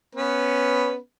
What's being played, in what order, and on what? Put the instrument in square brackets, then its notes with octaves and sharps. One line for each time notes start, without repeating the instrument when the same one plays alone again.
[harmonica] B3 C#4 B4